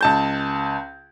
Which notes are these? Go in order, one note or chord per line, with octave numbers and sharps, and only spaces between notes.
C#2 A5 G6